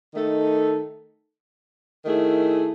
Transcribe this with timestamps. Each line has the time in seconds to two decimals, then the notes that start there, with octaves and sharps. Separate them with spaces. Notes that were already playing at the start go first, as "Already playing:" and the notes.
0.14 D#3 A3 D#4 A4
2.05 D#3 A3 E4 G#4